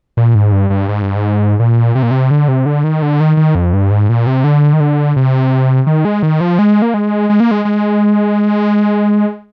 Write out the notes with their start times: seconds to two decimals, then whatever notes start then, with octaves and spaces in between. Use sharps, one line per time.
0.17 A#2
0.35 G#2
0.52 G2
0.70 G2
0.89 G#2
1.02 G2
1.16 G#2
1.60 A#2
1.95 C3
2.03 A#2
2.11 C3
2.31 D3
2.48 C3
2.66 D3
2.84 D#3
3.02 D3
3.20 D#3
3.37 D#3
3.55 F2
3.73 G2
3.91 G#2
4.09 A#2
4.27 C3
4.44 D3
4.73 D#3
4.80 D3
5.16 C3
5.87 D#3
6.05 G#3
6.23 D#3
6.41 F3
6.59 G#3
6.82 A#3
6.94 G#3
7.30 G#3
7.40 A#3
7.51 G#3
7.65 G#3